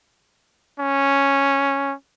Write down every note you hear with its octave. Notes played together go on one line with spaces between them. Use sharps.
C#4